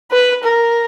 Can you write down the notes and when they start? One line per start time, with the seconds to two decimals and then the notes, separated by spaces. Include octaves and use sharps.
0.12 B4
0.43 A#4